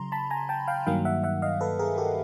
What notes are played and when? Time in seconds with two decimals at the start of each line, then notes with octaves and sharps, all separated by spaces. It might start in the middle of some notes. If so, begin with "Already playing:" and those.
Already playing: C#3 F#3 A#5 C6
0.12 A5 B5
0.30 G#5 A#5
0.49 G5 A5
0.68 F5 G5
0.86 G2 D#3 F#3 A#3 F5 G5
1.05 E5 F#5
1.24 E5 F#5
1.42 D#5 F5
1.61 A4 B4
1.79 G#4 A#4
1.98 G4 A4